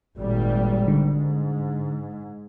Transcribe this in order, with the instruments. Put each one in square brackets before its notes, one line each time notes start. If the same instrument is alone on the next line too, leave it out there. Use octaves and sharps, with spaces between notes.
[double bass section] G#1 A#2 G3
[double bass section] G#2 [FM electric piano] D3